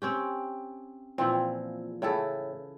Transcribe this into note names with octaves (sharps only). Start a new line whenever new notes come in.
C4 C#4 G4
A#2 E3 F3 C4
A2 C#3 E4 A4